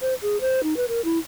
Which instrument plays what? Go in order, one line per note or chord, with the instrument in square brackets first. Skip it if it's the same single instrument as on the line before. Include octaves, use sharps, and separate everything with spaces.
[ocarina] C5
G#4
C5
D#4
B4
A#4
E4